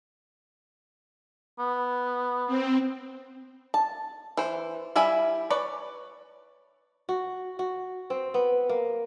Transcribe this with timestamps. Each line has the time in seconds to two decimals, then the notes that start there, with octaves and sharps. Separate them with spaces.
1.59 B3
2.47 C4
3.74 A5
4.37 E3 C5
4.96 G3 E4 E5 G#5 B5
5.50 B4 C#5 D5
7.09 F#4
7.59 F#4
8.10 C4
8.34 B3
8.69 A#3